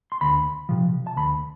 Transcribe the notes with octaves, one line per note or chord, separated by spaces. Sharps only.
C6
D2 B5
C3 F3
A5
D2 B5